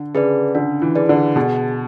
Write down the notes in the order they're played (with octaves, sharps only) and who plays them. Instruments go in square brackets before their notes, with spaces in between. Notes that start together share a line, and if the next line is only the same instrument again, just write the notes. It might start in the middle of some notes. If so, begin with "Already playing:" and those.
Already playing: [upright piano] D3
[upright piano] C#3 [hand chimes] G#4 B4 D5
[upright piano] D3 [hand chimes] D4
[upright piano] E3
[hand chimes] G#4 B4 D5
[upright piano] D3
[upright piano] B2 [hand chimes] G#4